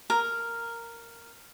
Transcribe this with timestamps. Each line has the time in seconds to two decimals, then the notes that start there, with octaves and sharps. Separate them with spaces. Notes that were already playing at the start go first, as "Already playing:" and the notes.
0.10 A#4